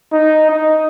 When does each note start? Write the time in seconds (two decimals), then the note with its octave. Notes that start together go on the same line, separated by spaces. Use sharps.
0.12 D#4
0.50 D#4